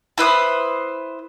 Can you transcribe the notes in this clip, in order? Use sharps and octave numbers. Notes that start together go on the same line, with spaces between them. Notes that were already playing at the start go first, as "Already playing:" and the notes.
E4 B4 C5 D#6